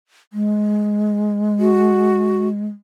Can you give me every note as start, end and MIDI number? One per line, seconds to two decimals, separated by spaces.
0.33 2.66 56
1.59 2.48 66